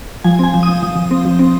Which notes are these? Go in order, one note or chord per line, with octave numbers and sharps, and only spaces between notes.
F3 G#5
C4 G#5
F3
D#6
F3
F3
F3
C4
F3
C4